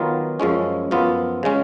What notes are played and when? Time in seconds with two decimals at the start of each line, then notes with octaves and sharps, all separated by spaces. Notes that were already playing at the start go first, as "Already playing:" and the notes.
Already playing: D#3 F#3 B3 F4
0.40 F#2 F3 G#3 C#4
0.91 F#2 F3 B3 F4
1.43 C#3 G#3 C#4